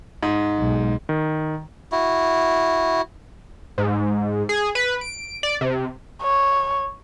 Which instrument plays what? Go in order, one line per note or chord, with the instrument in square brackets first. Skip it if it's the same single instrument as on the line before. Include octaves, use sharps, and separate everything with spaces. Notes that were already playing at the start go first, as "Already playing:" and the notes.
[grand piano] G#2
[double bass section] B1 G#3
[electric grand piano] D#3
[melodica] E4 F#4
[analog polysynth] G#2
G#4
B4
D7
D5
C3
[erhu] C#5